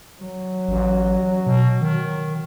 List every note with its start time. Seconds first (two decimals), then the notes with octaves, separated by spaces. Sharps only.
0.22 F#3
0.68 A1
1.47 B2
1.81 D#3